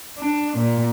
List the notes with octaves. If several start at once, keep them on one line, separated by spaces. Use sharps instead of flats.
D4
A#2